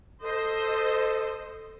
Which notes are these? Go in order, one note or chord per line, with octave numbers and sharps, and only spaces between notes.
A4 C5 D#5